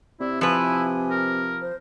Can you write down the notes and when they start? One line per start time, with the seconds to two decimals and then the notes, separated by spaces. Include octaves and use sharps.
0.20 C3 E4 D5
0.41 F3 E4 B4 G#5
1.10 A#4
1.61 C5